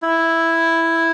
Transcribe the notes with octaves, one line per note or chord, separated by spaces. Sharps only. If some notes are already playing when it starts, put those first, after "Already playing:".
E4